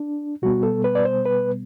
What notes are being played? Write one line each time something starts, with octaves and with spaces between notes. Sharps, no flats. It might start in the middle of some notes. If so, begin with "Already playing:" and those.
Already playing: D4
B2 G3 B3 F#4
A4
B4
D5
C5
B4